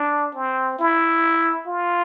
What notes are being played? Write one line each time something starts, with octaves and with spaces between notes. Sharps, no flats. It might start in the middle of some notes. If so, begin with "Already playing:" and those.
Already playing: D4
C4
E4
F4